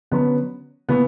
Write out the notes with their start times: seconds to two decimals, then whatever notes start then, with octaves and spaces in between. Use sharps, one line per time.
0.12 D3 F#3 B3 C#4
0.89 C#3 E3 A#3 B3